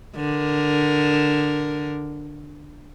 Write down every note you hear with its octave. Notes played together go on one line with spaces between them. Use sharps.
D3 A#4